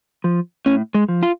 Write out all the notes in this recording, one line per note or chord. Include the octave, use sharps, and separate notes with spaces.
F3
A2 C#4
G#3
F3
F4